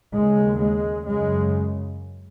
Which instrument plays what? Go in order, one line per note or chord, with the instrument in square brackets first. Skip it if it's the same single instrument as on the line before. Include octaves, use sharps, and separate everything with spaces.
[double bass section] D#2 C#3 G#3
G#3
F#2 C#3 G#3